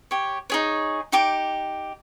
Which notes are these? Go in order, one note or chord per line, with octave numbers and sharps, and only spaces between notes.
G4 C#5
D#4 G#4 C#5
D#4 G4 D6